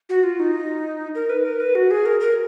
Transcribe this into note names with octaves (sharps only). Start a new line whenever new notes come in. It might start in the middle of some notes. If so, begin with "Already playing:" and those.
F#4
F4
D#4
A#4
B4
A#4
B4
F#4
G#4
A#4
A#4